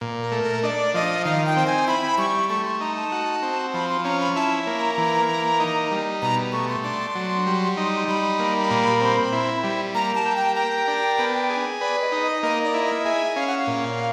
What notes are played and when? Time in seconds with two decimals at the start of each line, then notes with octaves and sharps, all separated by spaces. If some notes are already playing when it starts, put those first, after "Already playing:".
0.01 A#2
0.22 A#4
0.32 A3
0.42 A#4
0.63 D4 D5 D#5
0.94 F3 D#5
1.25 D#3 F5
1.46 G5
1.56 C4
1.67 G#5
1.88 E4 B5
2.18 G3 C#6
2.50 A3 C#6
2.65 C6
2.80 D#4 A#5
2.96 A5
3.12 F#4
3.42 C4
3.74 F3 B5
3.89 C6
4.04 C#4 A#5
4.21 B5
4.36 E4 A5
4.67 A#3
4.77 A#5
4.98 E3
5.29 A#3
5.60 D#4
5.91 G3
6.22 B2 A#5
6.53 A3 C#6
6.69 C6
6.84 D4 C6
7.15 F#3
7.46 G3
7.77 D#4
8.08 G3 B5
8.40 A#3
8.71 A#2
9.01 C4
9.32 E4
9.64 G3
9.95 A#3 A#5
10.15 A5
10.25 G4
10.36 G5
10.56 A#4 G5
10.88 D4
11.19 B3
11.50 G#4
11.81 B4 D5
12.01 D#5
12.12 D#4
12.22 D#5
12.43 A#3 D#5
12.64 D5
12.74 E4
12.84 D#5
13.05 G#4 E5
13.36 C#4 F5
13.47 F#5
13.58 F5
13.67 A#2